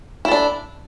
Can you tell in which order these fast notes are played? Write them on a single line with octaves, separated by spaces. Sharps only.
E4 A4 D4